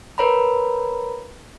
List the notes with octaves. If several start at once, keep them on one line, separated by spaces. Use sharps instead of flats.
A#4 B4 C#5 A#5 B5